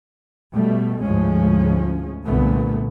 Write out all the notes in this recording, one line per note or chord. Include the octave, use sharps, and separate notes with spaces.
B2 G3 A3
D2 G#2 F3 G#3 C#4
C2 A#2 D3 A3 B3